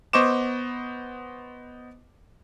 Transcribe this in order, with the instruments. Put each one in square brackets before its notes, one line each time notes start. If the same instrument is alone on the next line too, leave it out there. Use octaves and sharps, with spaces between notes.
[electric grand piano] B3 C5 D#5 C#6 D6 E7